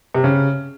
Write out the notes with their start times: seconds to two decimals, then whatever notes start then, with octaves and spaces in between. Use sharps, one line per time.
0.14 C3
0.24 C#3